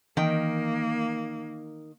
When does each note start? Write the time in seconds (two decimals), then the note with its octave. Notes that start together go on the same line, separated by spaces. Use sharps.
0.17 D#3 E3 A#3 G5